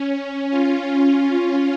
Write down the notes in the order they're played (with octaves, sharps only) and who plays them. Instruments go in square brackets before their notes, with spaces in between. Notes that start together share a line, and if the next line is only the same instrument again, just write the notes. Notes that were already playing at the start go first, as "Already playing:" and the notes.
Already playing: [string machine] C#4
C#4 F4